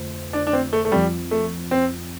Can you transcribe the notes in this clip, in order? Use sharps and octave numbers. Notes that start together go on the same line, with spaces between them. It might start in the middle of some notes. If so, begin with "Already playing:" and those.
Already playing: F2 D3 A3 F4 C5
D4
D4
C4
A3
A3
F2 F3 G3 C4 F4
A3
C4